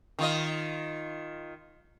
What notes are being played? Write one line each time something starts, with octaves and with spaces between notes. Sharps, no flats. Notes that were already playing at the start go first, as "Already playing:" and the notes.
D#3 F4 D#5